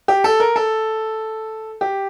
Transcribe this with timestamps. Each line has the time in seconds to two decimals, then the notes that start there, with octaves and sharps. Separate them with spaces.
0.08 G4
0.24 A4
0.40 A#4
0.56 A4
1.81 G4